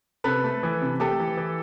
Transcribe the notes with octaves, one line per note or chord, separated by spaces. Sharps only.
C3 A4 B4
A3
E3
C3
A3 G4 A4
E3
E3